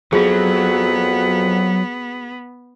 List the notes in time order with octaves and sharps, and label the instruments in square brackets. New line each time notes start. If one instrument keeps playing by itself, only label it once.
[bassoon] F2 [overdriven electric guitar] F#3 [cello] B3 [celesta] F#4 G#4